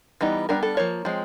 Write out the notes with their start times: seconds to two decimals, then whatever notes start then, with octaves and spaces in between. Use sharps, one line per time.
0.21 E3 G3 B3 D#4
0.49 G3 B3 D4 A#4
0.63 A4
0.77 F3 A#3 C#5
1.05 F3 G#3 C4